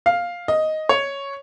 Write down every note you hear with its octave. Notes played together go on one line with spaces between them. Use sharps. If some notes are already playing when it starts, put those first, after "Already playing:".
F5
D#5
C#5